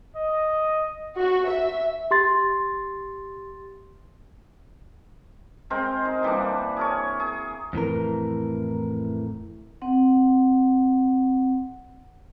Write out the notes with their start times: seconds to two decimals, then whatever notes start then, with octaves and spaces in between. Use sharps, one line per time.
0.16 D#5
1.18 F#4
1.48 E5
2.11 G4 C6 A6
5.70 G#3 C4 A#4 C5
6.05 D#4
6.23 E3 G3 A#3 D4
6.77 G#4 A#4 C#5
7.20 G#4
7.73 F2 A2 E3 A#4
9.82 C4 F#5